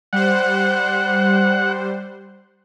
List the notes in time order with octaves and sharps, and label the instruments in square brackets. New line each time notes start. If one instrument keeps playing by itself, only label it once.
[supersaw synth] G3 C5 [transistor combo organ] F#5